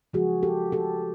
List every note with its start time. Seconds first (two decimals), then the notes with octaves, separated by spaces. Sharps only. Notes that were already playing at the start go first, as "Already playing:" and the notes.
0.13 C#3 F3 G#3 F#4 G#4
0.43 G4 A4
0.72 G4 A4